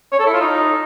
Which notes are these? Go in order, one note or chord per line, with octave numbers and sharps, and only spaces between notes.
C#5
A4
E4
F4
D#4